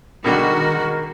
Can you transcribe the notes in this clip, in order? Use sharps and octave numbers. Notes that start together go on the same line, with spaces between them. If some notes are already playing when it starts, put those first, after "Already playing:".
B2 D3 D#3 G3 G#3 F#4 A#4